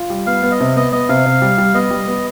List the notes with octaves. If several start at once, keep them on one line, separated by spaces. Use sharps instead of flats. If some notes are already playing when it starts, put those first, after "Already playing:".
Already playing: F4
G3
B3 F5
B3
D#5
C3
B3 D#5
B3 D#5
C3 F5
C3
G3
G3
B3 D#5
G3
B3